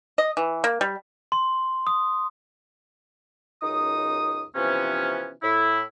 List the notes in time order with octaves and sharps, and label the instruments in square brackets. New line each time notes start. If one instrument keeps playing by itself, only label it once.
[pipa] D#5
E3
A#3
G3
[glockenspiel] C6
D#6
[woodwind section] C#2 F#2 D#4 D#6
C3 E3 F3 B3 C#4
A2 E4